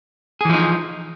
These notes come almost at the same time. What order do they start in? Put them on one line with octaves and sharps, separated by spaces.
G#4 E3 F3 D#4